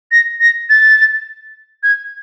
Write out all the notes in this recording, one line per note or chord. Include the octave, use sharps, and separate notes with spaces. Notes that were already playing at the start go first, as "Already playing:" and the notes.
A#6
A#6
A6
G#6